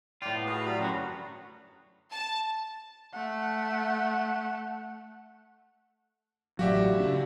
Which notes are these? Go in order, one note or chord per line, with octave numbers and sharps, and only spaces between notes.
A2 F4 D5 G5
B3
F#4 G#4 B4
F#3 G3 B5
F#2 D3 F#4 G4
A5
A3 F#5
A1 F#3 F#4 G4 D5 E5 F5
C#3 D4